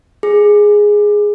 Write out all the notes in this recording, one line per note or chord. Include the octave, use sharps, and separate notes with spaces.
G#4